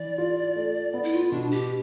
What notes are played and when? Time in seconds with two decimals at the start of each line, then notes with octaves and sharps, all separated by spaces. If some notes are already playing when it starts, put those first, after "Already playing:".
Already playing: E3 D5
0.18 F4
0.56 A3
0.94 B3
1.03 E4
1.13 F4
1.32 B2 D4
1.51 G4